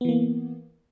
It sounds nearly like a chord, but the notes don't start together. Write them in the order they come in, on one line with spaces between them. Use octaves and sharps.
B3 E3 A#3